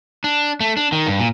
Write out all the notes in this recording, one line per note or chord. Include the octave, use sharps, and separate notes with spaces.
D4
A3
D4
D#3
G2
A#2